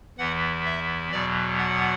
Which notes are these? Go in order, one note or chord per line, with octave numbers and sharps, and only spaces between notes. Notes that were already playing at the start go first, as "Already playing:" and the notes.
E2 E3 F#5
E5
E2 B2 F#3 D5
F#5